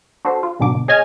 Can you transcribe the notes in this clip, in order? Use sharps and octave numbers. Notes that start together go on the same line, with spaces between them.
D4 F#4 A4 C5
F4
C2 G#2 B2 D3 F#3 D6
B2
G#4 C#5 D#5 G#5 F6 G#6